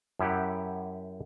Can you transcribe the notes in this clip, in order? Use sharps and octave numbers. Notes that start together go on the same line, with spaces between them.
F#2 E4 G4 F#5